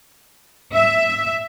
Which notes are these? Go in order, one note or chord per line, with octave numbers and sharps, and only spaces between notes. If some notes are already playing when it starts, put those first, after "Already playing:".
E5